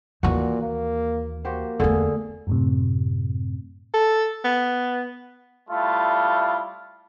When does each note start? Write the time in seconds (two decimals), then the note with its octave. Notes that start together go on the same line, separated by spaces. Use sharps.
0.23 D#2 A#2 E3 F#4
0.62 A#3
1.45 A#3 F#4 G4 C5
1.80 E2 D3 A3 G#4
2.47 F#2 A2 C3
3.94 A4
4.44 B3
5.70 G3 A3 E4 F4